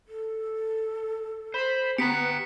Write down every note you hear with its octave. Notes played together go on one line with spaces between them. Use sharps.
A4
C5 B5
B3 G4 A#5 B6 C#7